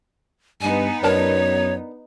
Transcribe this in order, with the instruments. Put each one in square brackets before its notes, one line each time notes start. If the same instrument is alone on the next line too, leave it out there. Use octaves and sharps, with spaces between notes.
[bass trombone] G2 [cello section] B3 D#4 [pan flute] G#5
[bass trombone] F#2 [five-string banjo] D4 A#4 A5 [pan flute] C#5